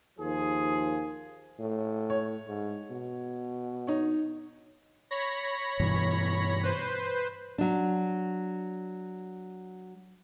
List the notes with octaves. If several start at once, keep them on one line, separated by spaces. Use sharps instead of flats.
D#2 F3 G#4
A2
C#5
G#2
B2
D#4 C#5
C#5 B5 A#6
G2 B2 E3
B4 C5
F#3 D4